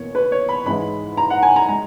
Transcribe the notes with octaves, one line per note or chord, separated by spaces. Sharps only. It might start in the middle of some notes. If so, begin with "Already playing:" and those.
Already playing: E2 B2 A#3 C#5
B4
C#5
B5
G#2 E3 G#3 B5
A#5
F#5
G#5
A#5
G#3 A#5